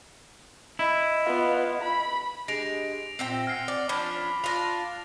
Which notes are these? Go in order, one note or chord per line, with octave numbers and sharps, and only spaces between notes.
E4 D#5
B3 F4
B5
G#3 D4 G4 G#4 A#6 D7 F7
A#2 C4 E5 G5
F#5 G#5 F6 C7
C4 D5 F#5
F3 C#4 D4 B5
D4 F4 A#6 F7